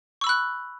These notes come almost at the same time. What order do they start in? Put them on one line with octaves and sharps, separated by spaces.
C#6 E6 B5 F#6